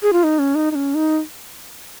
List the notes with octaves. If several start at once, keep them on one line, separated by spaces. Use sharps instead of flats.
G#4
F4
D#4
C#4
D#4
D#4
C#4
D#4